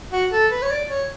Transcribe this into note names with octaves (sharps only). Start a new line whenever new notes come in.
F#4
A4
B4
C#5
D5
C#5